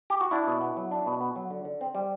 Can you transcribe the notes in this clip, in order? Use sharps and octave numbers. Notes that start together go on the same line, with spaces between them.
G4
F#4
D4 E4
B2
B3
F#3
D4
B2
B3
F#3
D3
D3
C4
G3